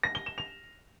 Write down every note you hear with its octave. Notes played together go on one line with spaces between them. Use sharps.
A#6
G7
E7
F7